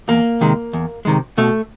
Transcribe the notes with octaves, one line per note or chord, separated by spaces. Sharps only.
E2 A#3
C3 D#3 G#3
E2
C3 D#3 G#3
B2 A3